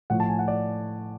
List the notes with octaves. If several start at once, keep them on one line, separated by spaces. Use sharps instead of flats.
A2 F3 F#5
A5
G#5
F#5
D5